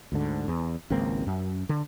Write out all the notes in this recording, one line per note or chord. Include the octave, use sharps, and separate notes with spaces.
D2 G#2 D3
E2
G#1 C#2 A#3 C4
F#2
D3